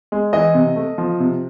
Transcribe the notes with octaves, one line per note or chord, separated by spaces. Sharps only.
G#3
E3 D#5
C3
A3
F3
C3